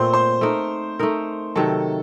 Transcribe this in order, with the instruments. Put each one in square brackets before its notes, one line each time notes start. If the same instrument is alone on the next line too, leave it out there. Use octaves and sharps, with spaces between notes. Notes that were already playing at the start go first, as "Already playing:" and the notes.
Already playing: [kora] A#2 A3 C4 [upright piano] C5 C6
[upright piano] C5 C6
[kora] A3 D#4 A#4
A3 D#4 A#4
[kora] C3 D#3 F#3 [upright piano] A4 A5